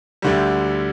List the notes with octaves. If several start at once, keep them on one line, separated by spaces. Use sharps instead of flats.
D2 D3 G3